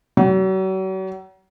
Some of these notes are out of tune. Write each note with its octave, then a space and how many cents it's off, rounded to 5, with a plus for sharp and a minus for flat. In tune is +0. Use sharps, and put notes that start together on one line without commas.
F#3 +40